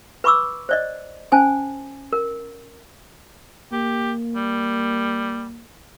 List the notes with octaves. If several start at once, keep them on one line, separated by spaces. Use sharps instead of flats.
B4 B5 C#6 D6 E6
C5 D5 D#5
C#4 C5 G#5 A5
A#4
A#3 G4
G3